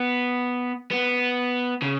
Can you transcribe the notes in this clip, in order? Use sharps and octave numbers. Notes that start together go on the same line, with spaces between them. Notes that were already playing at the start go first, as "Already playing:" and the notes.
Already playing: B3
B3
C#3